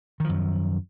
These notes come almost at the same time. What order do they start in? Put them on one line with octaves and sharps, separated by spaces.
D#3 F3 F#2